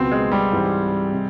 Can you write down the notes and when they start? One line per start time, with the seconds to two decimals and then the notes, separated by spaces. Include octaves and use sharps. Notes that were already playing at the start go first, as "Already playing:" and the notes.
Already playing: C#2 B2 F#3 B3 C4
0.11 G#3
0.32 G3
0.52 G#2 E3 G3 C4
1.13 C3